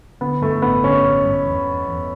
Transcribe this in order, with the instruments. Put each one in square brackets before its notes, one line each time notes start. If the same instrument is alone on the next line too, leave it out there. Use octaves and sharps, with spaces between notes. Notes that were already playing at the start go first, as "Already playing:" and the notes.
[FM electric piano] D3 [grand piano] B3
[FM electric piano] G2 [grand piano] A3
[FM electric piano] A1 [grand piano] B3
[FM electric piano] D3 [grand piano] C#4
[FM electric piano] A1
G2
E2
E2
E2